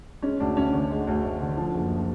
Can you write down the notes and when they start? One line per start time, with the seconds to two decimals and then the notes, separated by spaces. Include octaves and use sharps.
0.22 G#3 C#4
0.40 D2 D4
0.57 D2 C#4
0.73 D3 C#4
0.91 G#3
1.07 D2
1.25 D2
1.41 D3
1.57 F3
1.74 F#1